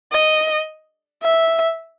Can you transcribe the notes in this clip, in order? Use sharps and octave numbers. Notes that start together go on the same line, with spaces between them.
D#5
E5